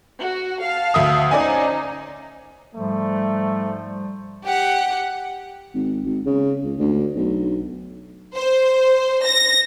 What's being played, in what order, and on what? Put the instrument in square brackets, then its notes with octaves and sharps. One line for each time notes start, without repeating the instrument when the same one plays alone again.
[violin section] F#4
F5 A5
[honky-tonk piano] D2 E5 D#6
[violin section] C#4 D#4 C5 [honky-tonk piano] D5 D#5 G#5
[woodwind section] G#2 F3 G3 [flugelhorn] A3
[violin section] G4 F#5 [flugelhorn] G5
[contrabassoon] G#1
G#1
C#3
C#2
D2
B1
[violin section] C5
A#6